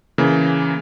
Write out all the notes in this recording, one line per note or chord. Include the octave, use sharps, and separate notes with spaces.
C#3 E3 A#3